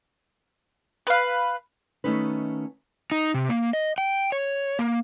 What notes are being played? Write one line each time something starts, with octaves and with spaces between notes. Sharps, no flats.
B4 F5
D#3 A3 B3 C#4 D#4 B4
D#4
C3
A#3
D#5
G5
C#5
A#3